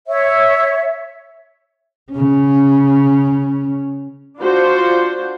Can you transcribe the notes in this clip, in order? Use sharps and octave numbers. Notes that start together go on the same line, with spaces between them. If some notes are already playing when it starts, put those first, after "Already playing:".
C#5 E5
C#3 C#4
D4 F4 F#4 C5